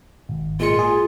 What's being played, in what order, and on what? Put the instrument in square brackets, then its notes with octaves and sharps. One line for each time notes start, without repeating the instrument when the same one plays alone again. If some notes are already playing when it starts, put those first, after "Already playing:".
[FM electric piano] G#1
[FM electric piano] A#2 G#3 C#7 [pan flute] F4
[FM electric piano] G#4